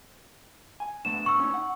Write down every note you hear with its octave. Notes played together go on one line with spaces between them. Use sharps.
G#5
A3 B3 D4 E7
C#6 E6
C#4 D#4
F#5